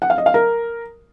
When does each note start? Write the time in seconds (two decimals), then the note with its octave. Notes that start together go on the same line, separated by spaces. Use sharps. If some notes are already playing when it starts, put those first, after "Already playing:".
0.02 F#5
0.10 F5
0.18 D#5
0.26 F5
0.34 A#4